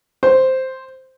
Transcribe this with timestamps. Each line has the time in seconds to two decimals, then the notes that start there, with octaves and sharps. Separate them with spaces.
0.23 C5